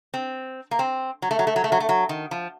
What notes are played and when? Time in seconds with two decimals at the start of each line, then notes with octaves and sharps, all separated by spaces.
0.14 C4
0.71 A#3
0.79 C4
1.22 F#3
1.31 A3
1.39 F#3
1.47 A3
1.56 F#3
1.64 A3
1.72 F#3
1.80 A3
1.89 F#3
2.09 D#3
2.31 F3